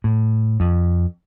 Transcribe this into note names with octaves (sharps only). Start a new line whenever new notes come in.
A2
F2